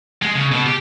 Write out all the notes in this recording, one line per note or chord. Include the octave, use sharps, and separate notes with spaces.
G#3
C#3
B2
G4